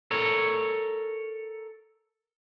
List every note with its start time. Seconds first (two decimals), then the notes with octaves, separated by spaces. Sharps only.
0.11 A4 A#4 C#5